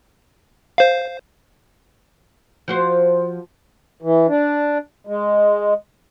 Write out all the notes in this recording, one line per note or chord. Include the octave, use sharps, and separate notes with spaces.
C5 F5
F3 F#4 C5
E3
D4
G#3